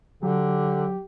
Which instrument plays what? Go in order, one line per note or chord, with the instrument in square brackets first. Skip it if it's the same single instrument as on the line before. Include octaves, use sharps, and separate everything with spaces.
[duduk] D3 [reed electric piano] F#3 [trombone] G4